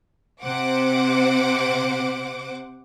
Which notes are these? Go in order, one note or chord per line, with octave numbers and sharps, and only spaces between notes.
C3 C5 F#5 D6